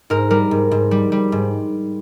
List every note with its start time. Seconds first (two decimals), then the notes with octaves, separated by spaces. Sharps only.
0.10 G#2 A#4
0.30 G3 A#4
0.51 G#2
0.71 G#2
0.91 G3
1.12 G3
1.32 G#2